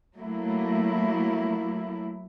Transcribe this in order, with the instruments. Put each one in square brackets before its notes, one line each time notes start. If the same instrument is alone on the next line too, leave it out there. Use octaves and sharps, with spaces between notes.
[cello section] F#3 A3 A#3 E4